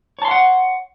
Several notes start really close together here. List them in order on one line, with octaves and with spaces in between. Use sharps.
C#5 A5 C6 F5 F#5